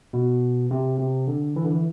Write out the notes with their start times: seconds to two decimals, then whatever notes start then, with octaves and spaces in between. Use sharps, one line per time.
0.13 B2
0.71 C3
0.99 C3
1.27 D3
1.56 E3
1.64 D3
1.71 E3